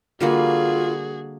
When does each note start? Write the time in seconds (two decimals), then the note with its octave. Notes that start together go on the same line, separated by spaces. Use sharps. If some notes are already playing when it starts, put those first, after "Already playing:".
0.21 D3 G3 A#3 F4 F#4 G#4